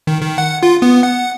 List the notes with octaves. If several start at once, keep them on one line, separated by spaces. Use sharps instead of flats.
D#3
D#3
F#5
F4
B3
F#5